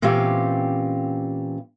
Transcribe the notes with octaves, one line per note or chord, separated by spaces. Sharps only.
A#2 E3 C4 C#4 G4 F5